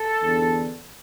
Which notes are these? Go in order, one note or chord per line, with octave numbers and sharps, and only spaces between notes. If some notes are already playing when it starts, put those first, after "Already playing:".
Already playing: A4
E2 D3